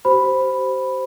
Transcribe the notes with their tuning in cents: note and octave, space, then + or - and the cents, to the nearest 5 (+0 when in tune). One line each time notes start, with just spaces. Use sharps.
G4 -40 C5 -5 B5 +0